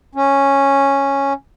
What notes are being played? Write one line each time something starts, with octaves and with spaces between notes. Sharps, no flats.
C#4